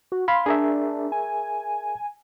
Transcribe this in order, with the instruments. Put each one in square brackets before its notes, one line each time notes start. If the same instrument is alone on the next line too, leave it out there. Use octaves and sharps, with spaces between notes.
[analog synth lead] F#4
[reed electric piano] F5 B5 [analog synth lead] C6
[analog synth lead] D4 [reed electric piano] G#4 A#4 E5
[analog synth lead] G#5